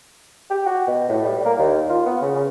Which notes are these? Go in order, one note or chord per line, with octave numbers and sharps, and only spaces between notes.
G4
F#4
B2
A2
G3
A#3
D#2
F4
B3
C#3
C#3